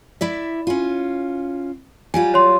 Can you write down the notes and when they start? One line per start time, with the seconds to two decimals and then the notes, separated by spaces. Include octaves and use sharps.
0.21 E4 D5 E5
0.67 C#4 F4
2.14 F#3 G3 F4 G#5
2.34 C#5 C6